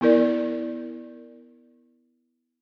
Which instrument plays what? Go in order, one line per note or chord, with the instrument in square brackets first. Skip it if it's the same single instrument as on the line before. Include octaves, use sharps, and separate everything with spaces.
[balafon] B3 E4 A#4 D5